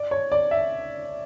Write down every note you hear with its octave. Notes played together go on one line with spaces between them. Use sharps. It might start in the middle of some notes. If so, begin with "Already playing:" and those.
Already playing: D5
C#5
D5
E5